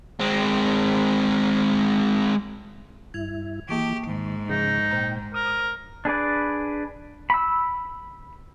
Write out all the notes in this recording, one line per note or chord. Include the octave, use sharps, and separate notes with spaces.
G#3 C4
G2 E4 G#6 F7
E3 A#3 G4 C#6 D7
G#2 D#3
C#3 F3 D#4 G#4
A#2 C5 G5 A#5
A#4 D#6
D4 G#4 B4 D5
B5 E6